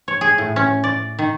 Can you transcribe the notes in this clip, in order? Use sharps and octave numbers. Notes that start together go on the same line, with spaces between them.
C#5
G#4
A2
C#4
D5
D#3